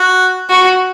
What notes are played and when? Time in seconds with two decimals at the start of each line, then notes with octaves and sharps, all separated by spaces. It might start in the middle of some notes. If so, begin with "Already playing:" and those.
Already playing: F#4
0.50 F#4